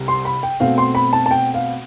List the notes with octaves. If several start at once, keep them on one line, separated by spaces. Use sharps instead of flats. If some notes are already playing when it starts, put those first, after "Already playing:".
Already playing: C2 C3 G3 C4
C6
B5
G5
B2 A3 C4 F5
C6
B5
A5
A5
G5
F5